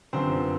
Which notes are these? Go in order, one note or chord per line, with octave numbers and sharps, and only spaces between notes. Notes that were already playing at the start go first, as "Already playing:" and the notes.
G1 F#2 D3 F3 C4 C5